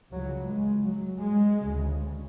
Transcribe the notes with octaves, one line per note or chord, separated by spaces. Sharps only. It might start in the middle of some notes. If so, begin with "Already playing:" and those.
C#2 C#3 F#3
G#3
F#3
G#3
D2 C#3